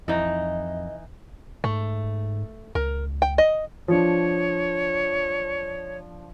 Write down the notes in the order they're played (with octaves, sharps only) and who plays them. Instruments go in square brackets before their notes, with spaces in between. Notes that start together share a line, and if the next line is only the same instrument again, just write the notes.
[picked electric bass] F2 [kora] E3 D#4 [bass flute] D#5
[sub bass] G#2 [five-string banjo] A3
[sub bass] C#2 [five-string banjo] A#4
[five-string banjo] G5
D#5
[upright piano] F3 D4 [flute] C#5